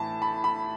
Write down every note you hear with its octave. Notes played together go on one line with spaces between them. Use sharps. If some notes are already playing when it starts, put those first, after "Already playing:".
Already playing: A2 E3 A5
B5
B5